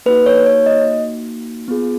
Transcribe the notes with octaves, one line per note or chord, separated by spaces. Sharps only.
A#3 D#4 F#4 B4
C#5
C#5
D#5
B3 F4 G#4